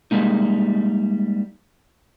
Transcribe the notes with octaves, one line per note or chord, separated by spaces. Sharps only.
G3 G#3 A#3 D#4